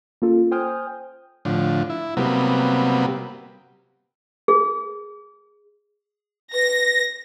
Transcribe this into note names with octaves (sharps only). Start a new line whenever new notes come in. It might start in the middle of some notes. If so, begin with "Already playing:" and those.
A#3 C#4 F4 A4
C5 G5 G#5 D#6 F6 G6
A2 D3 F3
E4
C3 F#3 G3 A#3 B3
G#4
B4 A#6